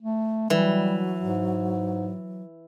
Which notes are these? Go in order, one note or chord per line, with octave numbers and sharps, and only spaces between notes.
A3
E3 F#3 G3
G#2